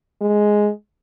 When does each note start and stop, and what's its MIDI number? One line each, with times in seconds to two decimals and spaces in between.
0.22 0.70 56